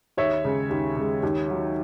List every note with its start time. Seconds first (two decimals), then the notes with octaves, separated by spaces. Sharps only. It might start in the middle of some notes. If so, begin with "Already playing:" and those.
0.17 D#2 C#5 E5
0.44 C#3 G#3
0.70 D#2
0.96 C#3 G#3
1.23 D#2
1.49 D#3 F#3